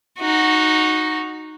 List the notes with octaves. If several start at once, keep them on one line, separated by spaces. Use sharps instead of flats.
D#4 F#4